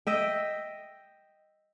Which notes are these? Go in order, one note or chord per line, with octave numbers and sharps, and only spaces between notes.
D#5 E5 G5